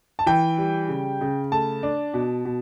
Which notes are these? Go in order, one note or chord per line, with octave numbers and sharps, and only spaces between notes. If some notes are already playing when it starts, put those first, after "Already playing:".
A5
E3 G5
G3
C#3
C#3
A3 A5
D4
B2
B2